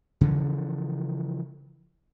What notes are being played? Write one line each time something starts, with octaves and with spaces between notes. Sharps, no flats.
C#3 E3 F3